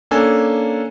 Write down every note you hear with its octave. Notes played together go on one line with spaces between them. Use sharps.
A#3 C#4 D4 A4 G#5